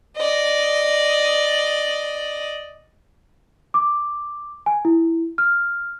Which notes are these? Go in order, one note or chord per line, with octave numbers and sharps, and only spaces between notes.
D5 D#5
D6
G#5
E4
F6